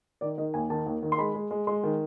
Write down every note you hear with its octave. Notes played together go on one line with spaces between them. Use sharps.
D#3 D5
D#3 D#5
D#2 G#5
D#3 A5
D#2
D#3
C6
G#3 B5
G#3
G#3
G#3 C6
D#3